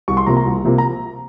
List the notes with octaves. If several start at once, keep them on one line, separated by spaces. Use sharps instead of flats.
C2 C#6
C6
C3 F3 A#3 A#5
A#5
C2
C3 F3 A#3
A#5